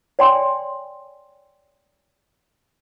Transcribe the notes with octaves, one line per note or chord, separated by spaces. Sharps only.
C#5 D5 G5 G#5 C6